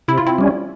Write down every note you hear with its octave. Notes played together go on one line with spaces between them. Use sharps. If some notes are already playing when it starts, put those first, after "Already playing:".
C3 E4
F4
C4 E4
G3 C#4